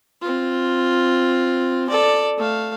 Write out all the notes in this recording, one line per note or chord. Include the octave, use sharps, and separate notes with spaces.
C4 F4
A4 D5
A3 F5